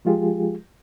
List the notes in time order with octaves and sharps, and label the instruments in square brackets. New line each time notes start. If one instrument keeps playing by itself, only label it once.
[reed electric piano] F3 G#3 F4 G4 G#4